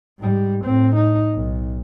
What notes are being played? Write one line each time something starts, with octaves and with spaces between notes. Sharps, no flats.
G#2 G3
A2 C4
D#4
B1